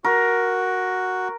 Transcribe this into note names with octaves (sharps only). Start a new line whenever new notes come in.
F#4 A#4